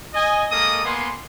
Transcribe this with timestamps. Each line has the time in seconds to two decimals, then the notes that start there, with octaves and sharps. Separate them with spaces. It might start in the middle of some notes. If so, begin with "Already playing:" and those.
0.14 D#5 G#5
0.51 G#3 A#3 A4 A#4 D#5 D#6
0.85 A#3 B3 G#5 C6